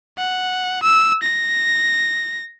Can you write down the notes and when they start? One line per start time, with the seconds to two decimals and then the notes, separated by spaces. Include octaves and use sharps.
0.18 F#5
0.83 E6
1.23 A#6